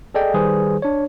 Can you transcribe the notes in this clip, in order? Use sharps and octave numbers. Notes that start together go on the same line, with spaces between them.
G#4 A4 D5 D#5 G5
D#3 G3 G#4 B4 C5
D4 C#5